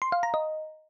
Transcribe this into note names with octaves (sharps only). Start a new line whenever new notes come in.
C6
F5
A#5
D#5